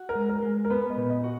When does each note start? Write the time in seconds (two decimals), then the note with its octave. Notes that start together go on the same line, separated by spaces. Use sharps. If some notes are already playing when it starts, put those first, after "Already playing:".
Already playing: F#4
0.09 A#4
0.15 G#3
0.29 A#4
0.42 G#3
0.65 A#4
0.70 B3 B4
0.90 D#5
0.97 A#2
1.10 D#5
1.24 F#4